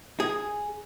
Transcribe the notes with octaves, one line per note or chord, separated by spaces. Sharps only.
G#4